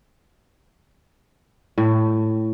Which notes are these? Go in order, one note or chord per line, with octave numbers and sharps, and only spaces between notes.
A2